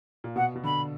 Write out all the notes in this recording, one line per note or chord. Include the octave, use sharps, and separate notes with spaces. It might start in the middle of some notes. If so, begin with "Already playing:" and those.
A#2
B2 F#5
B2
D3 B5